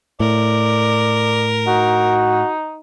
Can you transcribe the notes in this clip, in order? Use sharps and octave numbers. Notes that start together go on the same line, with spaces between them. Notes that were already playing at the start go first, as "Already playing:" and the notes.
A2 A#4 D5
D#4 F#4